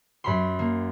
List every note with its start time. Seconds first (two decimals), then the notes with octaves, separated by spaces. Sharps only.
0.24 F#2 B5 C6
0.59 A#3